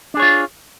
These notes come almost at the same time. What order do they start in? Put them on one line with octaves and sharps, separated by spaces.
D4 G#4 C#5 F4